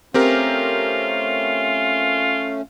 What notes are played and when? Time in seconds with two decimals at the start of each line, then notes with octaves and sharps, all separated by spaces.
0.14 A3 C4 C#4 F4 G4 A#4